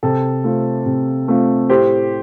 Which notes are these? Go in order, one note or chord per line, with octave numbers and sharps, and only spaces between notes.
C3 A4
A3 C4 F4
C3
A3 C4 F4
A2 G4 C5